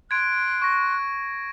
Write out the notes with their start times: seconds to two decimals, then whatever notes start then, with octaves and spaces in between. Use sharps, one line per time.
0.11 C6 F#6 G#6 D7
0.62 C#6 A#6